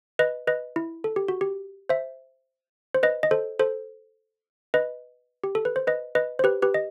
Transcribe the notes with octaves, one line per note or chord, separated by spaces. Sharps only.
B4 D#5
B4 D#5
E4
A4
G4
F#4
G4
C5 E5
C5
B4 D#5
D#5
A4 C5
A4 C5
B4 D#5
G4
A4
B4
C5
B4 D#5
B4 D#5
C5
G4 B4
G4 B4
D#5